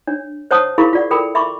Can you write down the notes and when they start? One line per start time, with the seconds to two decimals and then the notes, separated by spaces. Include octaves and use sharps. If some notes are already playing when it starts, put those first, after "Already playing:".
0.07 D4 C#5
0.51 C5 C#5 F#5 A5 D#6
0.78 E4 G#4 A#4 F5 B5 C#6
0.93 F4 D5 F#5
1.11 A4 A#4 G5 B5
1.35 E5 B5 C#6 D6